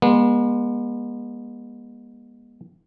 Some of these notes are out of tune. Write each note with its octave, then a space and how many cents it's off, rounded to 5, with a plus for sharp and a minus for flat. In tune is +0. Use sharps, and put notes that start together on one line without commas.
G#3 -20 B3 -40